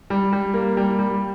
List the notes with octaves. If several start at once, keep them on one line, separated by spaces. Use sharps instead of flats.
G3
G3
A#3
G3
G3